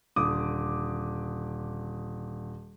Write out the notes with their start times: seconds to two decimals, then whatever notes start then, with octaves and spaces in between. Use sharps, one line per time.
0.16 D#1 D3 D6 D#6